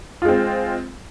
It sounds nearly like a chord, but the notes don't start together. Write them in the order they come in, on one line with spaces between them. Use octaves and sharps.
F4 G#3 C4